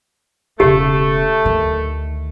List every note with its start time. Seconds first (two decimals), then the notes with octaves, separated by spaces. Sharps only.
0.60 E1 C#3 A3 G4
1.45 D2 D#3